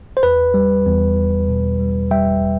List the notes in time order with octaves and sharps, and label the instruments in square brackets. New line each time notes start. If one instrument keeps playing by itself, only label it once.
[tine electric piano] C5
E2 B4
G3
E2
E2
B2
G3
G3 E5 G5